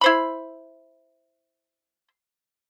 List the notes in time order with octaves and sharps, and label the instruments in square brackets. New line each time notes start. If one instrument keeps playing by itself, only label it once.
[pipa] E4 C5 B5